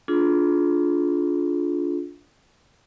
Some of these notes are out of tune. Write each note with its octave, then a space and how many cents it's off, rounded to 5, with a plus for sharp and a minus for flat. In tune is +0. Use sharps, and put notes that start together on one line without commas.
D4 -20 F4 +0 G#4 +35